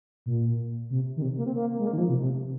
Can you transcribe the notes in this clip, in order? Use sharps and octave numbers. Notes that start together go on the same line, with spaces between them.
A#2
C3
D#3
C3
A#3
C4
A#3
G#3
A#3
D#3
F3
C3
C3